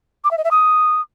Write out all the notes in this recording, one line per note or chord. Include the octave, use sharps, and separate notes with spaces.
D6
E5
D#5
E5
D#6